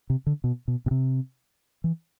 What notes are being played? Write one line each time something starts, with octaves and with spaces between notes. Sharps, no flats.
C3
D3
B2
B2
B2
C3
E3